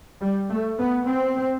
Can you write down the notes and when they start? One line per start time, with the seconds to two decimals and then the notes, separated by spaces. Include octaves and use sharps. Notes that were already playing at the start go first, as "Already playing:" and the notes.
0.21 G3
0.50 A3
0.79 B3
1.07 C4